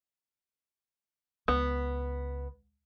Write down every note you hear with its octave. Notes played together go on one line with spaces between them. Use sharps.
C#2 B3